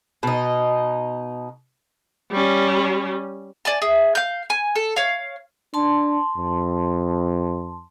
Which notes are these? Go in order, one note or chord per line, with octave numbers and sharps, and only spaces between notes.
B2 D#4
G3 C#4
D5 G#5 A5
G#4 E5
F5 G6
G#5
A4
C#5 F5
D4 A5 C6
F2